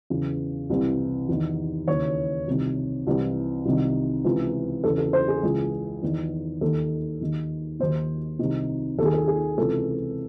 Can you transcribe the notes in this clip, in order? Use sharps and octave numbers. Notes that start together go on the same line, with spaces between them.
E2 C#3 E3
C2 C3 E3
E2 D#3
D#2 C#3 E3 C#5
C2 C3 D#3
C2 C3 E3
C2 C3 D#3
C#2 C3 E3
E2 C#3 E3 A4
A4
C5
G#4
C#2 C#3 E3
E2 D#3
D#2 D#3 A4
D#2 D#3
D#2 D#3 C5
C2 C3 D#3
D#2 D#3 G#4 A4
A4
G#4
C#2 C3 E3 A4